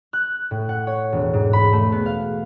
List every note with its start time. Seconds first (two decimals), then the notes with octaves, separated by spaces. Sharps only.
0.13 F#6
0.51 A2
0.69 F#5
0.87 C#5
1.12 E1
1.33 G#2
1.53 B5
1.73 A3
1.92 B3
2.06 F5